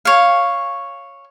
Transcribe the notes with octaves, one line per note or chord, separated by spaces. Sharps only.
C#5 F5